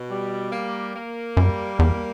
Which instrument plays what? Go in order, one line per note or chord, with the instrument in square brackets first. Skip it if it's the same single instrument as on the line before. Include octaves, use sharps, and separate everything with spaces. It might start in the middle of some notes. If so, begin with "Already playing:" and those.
Already playing: [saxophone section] B2
G3
A#3
A#3
[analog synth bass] F#2 [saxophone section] G3
[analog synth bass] E2 [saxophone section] A#3